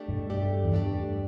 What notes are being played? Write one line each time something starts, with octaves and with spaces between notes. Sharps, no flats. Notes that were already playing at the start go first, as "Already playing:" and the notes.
Already playing: A3 D4 G4 D5
G2 B2
A3 D4 G4 D5
E2
G2 A3 D4 G4 D5